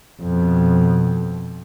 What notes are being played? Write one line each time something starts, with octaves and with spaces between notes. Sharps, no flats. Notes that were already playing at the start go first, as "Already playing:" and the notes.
F2 B2